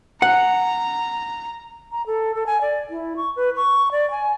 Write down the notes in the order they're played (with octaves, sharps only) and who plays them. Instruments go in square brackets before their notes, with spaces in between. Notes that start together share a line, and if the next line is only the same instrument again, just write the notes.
[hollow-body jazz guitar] F#5 [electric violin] A#5
[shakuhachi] A#5
A4
A4
G#5
D5
E4
C#6
B4
C#6
D5
G#5